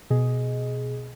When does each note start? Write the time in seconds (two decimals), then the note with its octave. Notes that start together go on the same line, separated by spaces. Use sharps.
0.10 B2 G#4 D#5